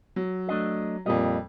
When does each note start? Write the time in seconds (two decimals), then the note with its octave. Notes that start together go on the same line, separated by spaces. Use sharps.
0.16 F#3
0.49 A3 D4 D#5
1.06 F2 A#2 G3 D#5